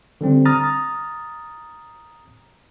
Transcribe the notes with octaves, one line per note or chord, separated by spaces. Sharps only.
D3 G3 C4
A#5 D#6 F6 A6